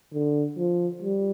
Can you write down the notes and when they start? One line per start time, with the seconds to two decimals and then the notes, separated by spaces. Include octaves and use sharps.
0.14 D3
0.57 F3
1.02 G3